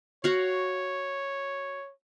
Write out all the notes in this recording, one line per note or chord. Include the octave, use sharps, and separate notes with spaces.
F#4 C#5 F5